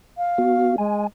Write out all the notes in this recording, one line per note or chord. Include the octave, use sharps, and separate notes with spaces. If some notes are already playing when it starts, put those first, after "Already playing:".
F5
B3 F#4
G#3 G#5